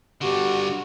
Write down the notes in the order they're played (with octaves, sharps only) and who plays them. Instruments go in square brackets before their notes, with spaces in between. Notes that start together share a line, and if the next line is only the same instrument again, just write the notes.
[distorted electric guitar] G2 D3 [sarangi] F#4 [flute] G4